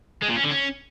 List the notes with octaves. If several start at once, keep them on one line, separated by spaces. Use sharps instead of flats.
G#3
A#2
C#4
D3
C#4